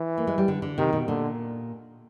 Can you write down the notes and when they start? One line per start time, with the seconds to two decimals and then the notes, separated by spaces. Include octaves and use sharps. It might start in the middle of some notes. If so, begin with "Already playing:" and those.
Already playing: E3
0.18 A#3
0.27 G#3
0.38 G3
0.48 D3
0.62 D3
0.78 C3 D#3
0.93 B2
1.07 A#2 D3